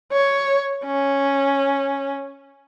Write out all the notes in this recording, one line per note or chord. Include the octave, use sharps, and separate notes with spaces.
C#5
C#4